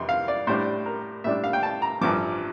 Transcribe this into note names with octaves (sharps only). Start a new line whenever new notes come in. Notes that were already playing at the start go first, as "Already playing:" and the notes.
Already playing: F2 C3 E3 C6
F5
D5
A2 G3 D4 C5
A#4
A2 G3 D4 E5
F5
G5
A5
A#5
A1 G2 F3 D6